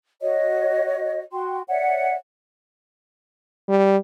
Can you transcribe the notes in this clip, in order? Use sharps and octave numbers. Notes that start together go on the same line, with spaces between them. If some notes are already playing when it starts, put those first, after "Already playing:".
F#4 C#5 D#5
F#4 G5 C6
C#5 D5 E5 F#5
G3